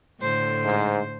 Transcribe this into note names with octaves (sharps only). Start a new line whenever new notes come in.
A2 D3 C5
G#2